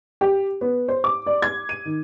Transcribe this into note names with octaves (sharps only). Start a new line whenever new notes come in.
G4
B3
C5
D6
D5
G#6
D#7
D#3